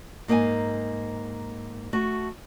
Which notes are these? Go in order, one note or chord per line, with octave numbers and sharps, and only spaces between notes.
G#2 A#3 D#4 G5 G#5
A3 F#4